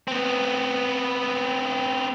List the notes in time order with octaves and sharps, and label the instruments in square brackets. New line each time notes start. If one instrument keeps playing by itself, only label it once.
[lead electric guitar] B3 C4